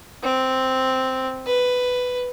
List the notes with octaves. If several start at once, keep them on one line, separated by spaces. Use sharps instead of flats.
C4
B4